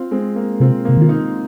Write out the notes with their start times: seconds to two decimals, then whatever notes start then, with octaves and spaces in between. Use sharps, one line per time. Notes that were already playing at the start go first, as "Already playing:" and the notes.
Already playing: C4 F4
0.11 G#3 C4
0.36 A#3
0.60 C3 C4 F4
0.85 C3 A#3
0.97 D#3 F4
1.09 A#3 D#4